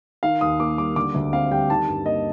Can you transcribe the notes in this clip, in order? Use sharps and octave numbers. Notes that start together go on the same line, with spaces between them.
D#3 F5
D#2 D#6
A#3 D6
G3 D6
D3 D6
D2
C4 F5
G3 G5
D#3 A5
G2
A#3 D#5